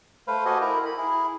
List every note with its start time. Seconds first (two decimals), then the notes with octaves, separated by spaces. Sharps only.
0.28 A3 B4 C5 F5
0.45 F#4 G4 A4 C5 D#5 G#5
0.61 E4 A#4
0.85 B5
0.97 E4 G#4